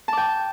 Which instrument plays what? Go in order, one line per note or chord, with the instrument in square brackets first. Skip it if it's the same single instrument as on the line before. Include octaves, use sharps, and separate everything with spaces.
[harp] A5
D6
G5